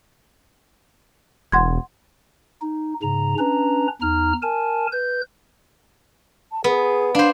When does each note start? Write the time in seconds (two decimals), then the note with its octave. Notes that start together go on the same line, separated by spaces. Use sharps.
1.52 E1 F#5 C6 G#6
2.62 D#4
3.02 G#2 C#3 A#5
3.39 C#4 D4 B4 A#5
4.02 E2 D#4 A#5 F6
4.42 A#4 G#5 A5
4.92 B4 G6
6.52 A5
6.64 B3 G#4
7.15 D4 C5 F5